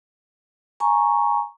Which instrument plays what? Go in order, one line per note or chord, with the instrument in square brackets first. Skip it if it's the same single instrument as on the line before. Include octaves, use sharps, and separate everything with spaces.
[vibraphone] G#5 A#5 C#6